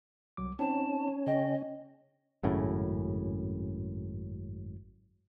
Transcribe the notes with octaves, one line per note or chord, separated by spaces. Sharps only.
C2 F#3 D6
C4 C#4 D#4 C5 A5
C#3 D#5 G5
G#1 F#2 A2 C#3